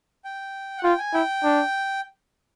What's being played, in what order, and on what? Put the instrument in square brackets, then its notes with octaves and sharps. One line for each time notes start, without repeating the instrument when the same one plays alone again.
[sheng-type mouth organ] G5
F#5
[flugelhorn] F4 [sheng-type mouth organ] G5
[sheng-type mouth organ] G#5
[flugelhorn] E4 [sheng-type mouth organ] G5
[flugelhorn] D4